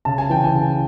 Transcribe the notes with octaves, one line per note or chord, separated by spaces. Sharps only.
C#3 A5
G#5
E3 G5
G#5
C#3